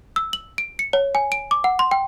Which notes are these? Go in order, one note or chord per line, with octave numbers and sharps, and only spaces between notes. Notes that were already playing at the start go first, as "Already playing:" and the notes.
E6
F#7
D7
C#7
C#5
G#5
D7
D6
F#5
C6
G5